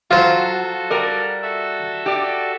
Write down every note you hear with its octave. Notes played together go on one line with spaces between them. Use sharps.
F#3 F4 F#4 A4 C5
G3 A#4 D5
F#4 A4 E5
G4 D5